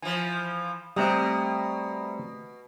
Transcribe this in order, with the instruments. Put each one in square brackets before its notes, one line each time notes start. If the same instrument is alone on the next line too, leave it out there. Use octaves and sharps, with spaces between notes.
[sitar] E3 F3 [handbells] G#5
[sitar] B2 [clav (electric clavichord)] G3 C4 [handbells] A3 A#5 D#6